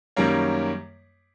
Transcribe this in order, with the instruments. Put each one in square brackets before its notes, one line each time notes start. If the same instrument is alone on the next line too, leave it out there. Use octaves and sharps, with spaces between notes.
[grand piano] F#2 D#3 G3 A#3 C#4